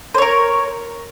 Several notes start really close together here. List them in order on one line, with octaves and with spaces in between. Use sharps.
C5 C#5 A#4